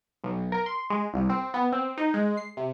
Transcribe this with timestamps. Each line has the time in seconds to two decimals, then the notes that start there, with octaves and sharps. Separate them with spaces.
0.24 B1
0.52 A#4
0.66 C6
0.90 G#3
1.14 C2
1.29 C4
1.54 B3
1.72 C4
1.98 D#4
2.14 G#3
2.37 C7
2.57 C3